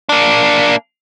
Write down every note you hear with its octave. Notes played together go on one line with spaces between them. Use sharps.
A#3 D4